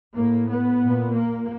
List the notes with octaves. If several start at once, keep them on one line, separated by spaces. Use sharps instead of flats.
A2 A#3
B3
A#2
A#3